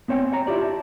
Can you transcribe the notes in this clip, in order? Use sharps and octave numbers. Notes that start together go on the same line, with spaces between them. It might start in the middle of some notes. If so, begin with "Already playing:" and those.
B3 C4 C#5 D5 G5 G#5
C#5 G5 A#5
E4 F4 G4 D5
A5